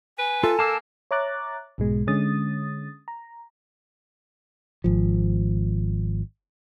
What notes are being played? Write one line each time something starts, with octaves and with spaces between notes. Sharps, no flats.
B4 G#5
F4 A4
A#3 A5 D6 E6
C#5 E5 A#5 D6 F#6 A6
B1 G#2 B2 G#3
D3 G#3 C#4 D#6 A6
A#5
G#1 F3